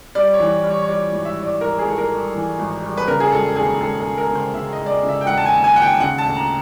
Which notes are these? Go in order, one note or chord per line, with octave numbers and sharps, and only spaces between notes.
G3 D5
C#5
E3
G3
C#5
C#5
G3 D5
G#1
E5
G3
D5
G3 A#4
G#4
G#1 A4
A#4
G3
E3
G#1
G3
B4
C#3 A#4
G#4
E1 A4
D#2 G#4
E1 A4
A4
E1
A#4
C#3
C5
C#3 E5
D#5
E1
D5
D#5
C#3
E5
G5
E1 F#5
A5
G#5
D#2
G#5
D#2 F#5
G5
C#3 F#5
A5
D2
A#5